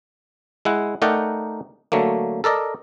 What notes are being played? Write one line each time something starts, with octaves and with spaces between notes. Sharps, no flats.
G#3 E4 F#5
A3 D#4 A#4 D5 F#5 G5
D3 F#3 A3 A#3
A4 A#4 D5 D#5